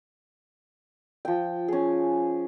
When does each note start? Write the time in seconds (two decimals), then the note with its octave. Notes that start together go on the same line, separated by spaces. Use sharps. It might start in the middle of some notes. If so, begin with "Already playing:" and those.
1.25 F3 G5
1.68 C#4 G#4